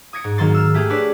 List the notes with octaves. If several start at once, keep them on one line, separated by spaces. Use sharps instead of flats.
D#6 G#6 A#6 C#7 D7
G#2
G#2 D#3 F#3 A#3 C6 A6
E6 F6
A3 G4 G#4
D4 B4 C#5 D5